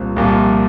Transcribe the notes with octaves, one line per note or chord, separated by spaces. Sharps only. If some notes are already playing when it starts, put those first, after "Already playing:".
Already playing: C2 A#2 F3 C4
C2 A#2 F3